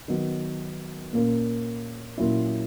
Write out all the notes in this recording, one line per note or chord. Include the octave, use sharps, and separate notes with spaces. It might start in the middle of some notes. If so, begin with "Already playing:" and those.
D#3 F#3 B3
A#2 A#3 C#4
A#2 F#3 C#4 E4